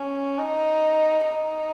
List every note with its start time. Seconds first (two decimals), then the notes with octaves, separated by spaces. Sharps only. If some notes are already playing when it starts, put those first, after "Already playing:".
Already playing: C#4
0.39 D#4
1.25 D#4